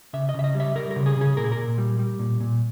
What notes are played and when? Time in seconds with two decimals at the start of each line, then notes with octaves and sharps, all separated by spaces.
0.13 C#3 E5
0.29 D#5
0.34 C#3 E5
0.44 D#5
0.55 G3
0.60 E5
0.76 G3 A#4
0.91 A#4
0.96 C#3
1.06 G#4
1.17 C#3 G#4
1.37 A#2 A#4
1.44 G#4
1.52 A#4
1.57 A#2
1.78 G3
1.99 G3
2.19 A#2
2.40 A#2